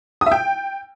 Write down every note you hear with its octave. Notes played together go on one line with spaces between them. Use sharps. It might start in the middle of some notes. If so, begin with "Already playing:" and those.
D#6
E5
G5